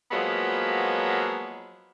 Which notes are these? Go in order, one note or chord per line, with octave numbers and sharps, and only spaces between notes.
F3 F#3 G#3 A#3 B3